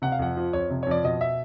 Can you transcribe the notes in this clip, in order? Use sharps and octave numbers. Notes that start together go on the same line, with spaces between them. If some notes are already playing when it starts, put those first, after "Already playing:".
C3 F#5
F5
F2 F#5
F3
F2 C#5
C3
C#5
F2 D5
B2 D#5
E5